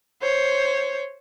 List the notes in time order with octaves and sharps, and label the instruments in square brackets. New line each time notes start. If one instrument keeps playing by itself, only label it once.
[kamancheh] C5 C#5